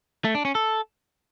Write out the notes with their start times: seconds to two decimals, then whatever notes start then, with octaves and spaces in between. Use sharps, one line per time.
0.25 A3
0.35 D4
0.45 C#4
0.55 A4